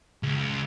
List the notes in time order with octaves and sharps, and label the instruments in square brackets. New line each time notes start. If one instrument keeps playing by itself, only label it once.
[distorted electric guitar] C#2